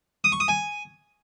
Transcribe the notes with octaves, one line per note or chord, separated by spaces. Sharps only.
D#6
C#6
D#6
G#5